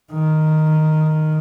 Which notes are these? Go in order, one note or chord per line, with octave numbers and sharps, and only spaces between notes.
D#3